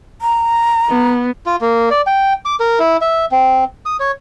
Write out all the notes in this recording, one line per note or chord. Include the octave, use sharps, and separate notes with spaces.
A#5
B3
F4
A#3
D5
G5
D6
A#4
E4
E5
C4
D#6
C#5